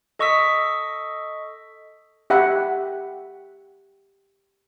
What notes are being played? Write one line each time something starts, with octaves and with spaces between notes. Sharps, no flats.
A4 D#5 C#6 D#6 E6 B6
G4 E5 F#5 B5